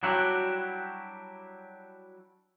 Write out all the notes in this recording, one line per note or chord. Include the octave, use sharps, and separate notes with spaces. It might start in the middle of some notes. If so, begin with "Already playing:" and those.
F#3 G3 D4 E4 F#4 G4